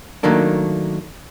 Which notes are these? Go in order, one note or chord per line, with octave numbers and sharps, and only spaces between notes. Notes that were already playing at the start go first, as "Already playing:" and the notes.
D#3 F#3 A3 A#3 D4